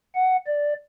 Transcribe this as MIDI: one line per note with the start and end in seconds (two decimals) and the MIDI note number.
0.15 0.36 78
0.47 0.74 74